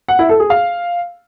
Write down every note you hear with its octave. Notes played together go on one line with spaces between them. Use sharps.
F#5
E4
A4
G#4
F5